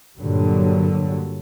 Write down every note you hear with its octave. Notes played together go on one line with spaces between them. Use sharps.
G2 A#2 D3 F#3